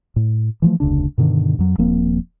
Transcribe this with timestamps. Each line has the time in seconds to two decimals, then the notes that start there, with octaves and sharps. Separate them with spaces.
0.16 A2
0.62 E3 F3 A3
0.80 F1 D2 C#3 D4
1.18 G2 B2 D3 D#3
1.59 F2 F#3
1.78 D#1 F3 A#3 C4